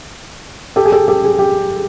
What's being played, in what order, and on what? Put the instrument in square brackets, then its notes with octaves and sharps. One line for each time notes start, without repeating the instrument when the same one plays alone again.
[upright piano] G4 A4
G#4
G4 A4
G4 A4
G#4
G#4
G4